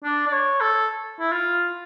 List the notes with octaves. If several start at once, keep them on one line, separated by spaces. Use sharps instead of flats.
D4
D5
C#5
A4
E4
F4